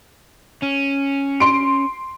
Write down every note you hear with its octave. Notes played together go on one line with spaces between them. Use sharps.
C#4
C6 D7